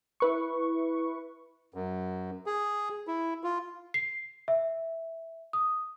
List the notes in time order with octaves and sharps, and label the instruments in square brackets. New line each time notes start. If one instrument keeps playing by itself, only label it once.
[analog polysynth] E4 B4 C#6
[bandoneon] F#2
G#4
E4
F4
[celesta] C7
E5
D#6